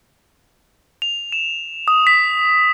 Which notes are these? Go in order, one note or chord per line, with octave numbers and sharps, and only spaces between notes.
F7
E7
D#6
B6